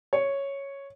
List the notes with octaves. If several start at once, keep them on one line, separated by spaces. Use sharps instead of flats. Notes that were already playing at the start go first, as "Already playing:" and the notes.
C#5